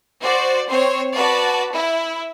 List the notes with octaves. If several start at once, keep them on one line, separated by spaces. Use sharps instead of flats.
F#4 C5 D5
C4 C5 C#5
F#4 B4 D5 A5
E4